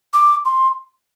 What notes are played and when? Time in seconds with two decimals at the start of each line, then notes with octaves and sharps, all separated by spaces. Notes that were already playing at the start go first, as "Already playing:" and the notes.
0.14 D6
0.45 C6